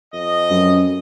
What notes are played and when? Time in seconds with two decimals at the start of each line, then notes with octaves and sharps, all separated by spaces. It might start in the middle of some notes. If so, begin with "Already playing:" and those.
0.13 F2 D#5
0.50 F#2